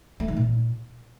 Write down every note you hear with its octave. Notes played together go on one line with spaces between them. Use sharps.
A3
D#3
A#2